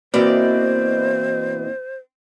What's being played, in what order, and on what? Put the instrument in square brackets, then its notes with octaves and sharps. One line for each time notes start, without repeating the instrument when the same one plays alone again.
[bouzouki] B2 E3 D5 [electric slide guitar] A#3 C4 [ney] C5